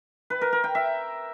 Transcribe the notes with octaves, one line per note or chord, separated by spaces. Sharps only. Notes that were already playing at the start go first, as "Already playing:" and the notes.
B4
A#4
A#4
G5
E5